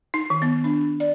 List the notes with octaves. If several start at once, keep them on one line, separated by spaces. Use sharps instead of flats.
D#4
D#3
B3
D4
D5